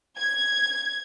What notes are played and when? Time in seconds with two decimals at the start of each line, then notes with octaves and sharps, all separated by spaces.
0.18 G#6